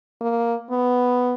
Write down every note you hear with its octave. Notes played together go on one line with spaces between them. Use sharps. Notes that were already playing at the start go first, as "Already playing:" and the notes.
A#3
B3